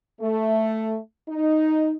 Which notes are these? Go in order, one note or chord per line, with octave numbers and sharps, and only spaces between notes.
A3
D#4